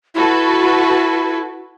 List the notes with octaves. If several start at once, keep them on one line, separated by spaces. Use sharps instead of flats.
E4 F#4 A4 B4